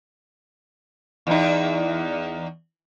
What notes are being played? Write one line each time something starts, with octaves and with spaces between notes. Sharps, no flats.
E2 D#4